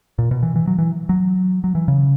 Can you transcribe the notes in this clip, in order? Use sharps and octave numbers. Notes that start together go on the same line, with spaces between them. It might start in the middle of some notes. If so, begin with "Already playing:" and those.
A#2
B2
E3
E3
F#3
E3
F#3
F#3
E3
C#3